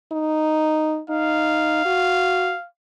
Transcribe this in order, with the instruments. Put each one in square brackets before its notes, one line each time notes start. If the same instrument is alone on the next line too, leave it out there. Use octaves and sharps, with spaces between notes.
[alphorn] D#4
[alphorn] D#4 [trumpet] F5
[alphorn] F#4